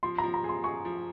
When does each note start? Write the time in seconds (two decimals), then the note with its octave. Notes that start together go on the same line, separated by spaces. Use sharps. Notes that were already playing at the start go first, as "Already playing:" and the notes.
0.03 F3 C6
0.18 F3 A#5
0.34 A#5
0.44 G#4 C6
0.64 G#4 C#6
0.85 F3